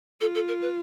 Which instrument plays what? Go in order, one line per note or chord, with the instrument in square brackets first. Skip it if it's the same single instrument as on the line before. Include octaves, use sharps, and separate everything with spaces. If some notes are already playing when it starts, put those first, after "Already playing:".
[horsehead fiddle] F4 [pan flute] A4
[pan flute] A4
A#4
B4